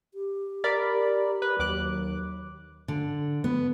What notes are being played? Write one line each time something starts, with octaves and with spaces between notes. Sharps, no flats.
G4
A#4 D5 B5
B4
D#2 F#3 D6 F#6
D3
B3